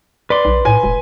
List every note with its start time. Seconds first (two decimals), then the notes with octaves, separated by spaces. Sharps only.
0.30 B4 D5 C6
0.45 B1
0.65 A2 G#5
0.83 E1